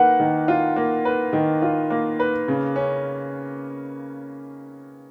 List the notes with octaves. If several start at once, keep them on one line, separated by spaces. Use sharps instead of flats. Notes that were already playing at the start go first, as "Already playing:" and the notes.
Already playing: D#3 A#3 B4 F#5
D#3
F4
A#3
B4
D#3
F4
A#3
B4
C#3
C#4